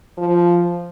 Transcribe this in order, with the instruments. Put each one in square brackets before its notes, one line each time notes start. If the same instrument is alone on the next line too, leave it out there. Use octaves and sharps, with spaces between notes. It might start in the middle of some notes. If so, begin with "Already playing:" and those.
[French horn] F3